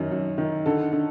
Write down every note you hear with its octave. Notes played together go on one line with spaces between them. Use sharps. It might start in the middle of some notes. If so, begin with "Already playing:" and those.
Already playing: F#2 D#3
F#2
D#3
D3 A4
D3